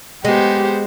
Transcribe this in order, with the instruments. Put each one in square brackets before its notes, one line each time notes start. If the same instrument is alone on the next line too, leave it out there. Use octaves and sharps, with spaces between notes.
[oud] G#3 [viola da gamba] B3 C5 [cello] G4